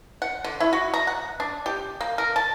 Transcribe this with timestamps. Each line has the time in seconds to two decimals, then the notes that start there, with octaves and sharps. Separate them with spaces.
0.22 F#5
0.44 D3
0.60 E4
0.73 F#4
0.94 A#5
1.07 F#5
1.40 D4
1.66 G4
2.01 A#3
2.18 A#4
2.36 A5